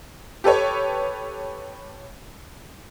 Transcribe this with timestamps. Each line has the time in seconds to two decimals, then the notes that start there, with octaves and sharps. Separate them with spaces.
0.44 G4 A4 B4 C#5